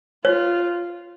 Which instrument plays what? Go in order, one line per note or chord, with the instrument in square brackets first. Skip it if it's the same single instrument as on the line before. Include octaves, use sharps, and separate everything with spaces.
[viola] F4 [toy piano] C#5